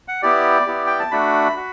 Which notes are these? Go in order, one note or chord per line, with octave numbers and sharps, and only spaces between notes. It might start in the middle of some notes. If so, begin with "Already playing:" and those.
F#5
B3 E4 G4 D5
B3 E4 G4
G5
A5
A3 D4 F#4 B5
F#4